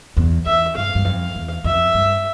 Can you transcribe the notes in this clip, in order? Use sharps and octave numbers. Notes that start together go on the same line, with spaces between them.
E2
E2 E5
G2 F5
G2
F2
F5
E2
F2 E5
G2